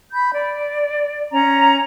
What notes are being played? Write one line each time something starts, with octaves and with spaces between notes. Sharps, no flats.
B5 G6
D5
C#4 A#5